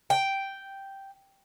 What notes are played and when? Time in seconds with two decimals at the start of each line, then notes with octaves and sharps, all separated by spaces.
0.10 G5